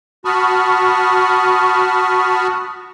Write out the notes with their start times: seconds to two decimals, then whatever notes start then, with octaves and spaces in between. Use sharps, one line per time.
0.25 F#4 A5 B5 C#6 D#6 F6